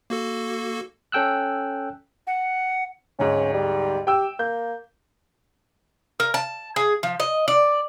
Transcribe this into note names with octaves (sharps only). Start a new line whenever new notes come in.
A#3 F#4 A4
C#4 A4 G5 E6 F#6
F#5
D1 G#2 C#4
G3
G4 G5 E6
A#3 G6
A#4
A5
G#4
F3
D#5
D5